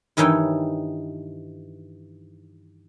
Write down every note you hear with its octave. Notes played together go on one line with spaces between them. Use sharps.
G2 D#3 E3 D#4 C#5 G5